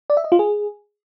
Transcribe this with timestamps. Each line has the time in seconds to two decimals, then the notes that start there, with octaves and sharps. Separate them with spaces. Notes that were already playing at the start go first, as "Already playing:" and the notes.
0.10 D5
0.17 E5
0.24 D#5
0.32 F4
0.39 G#4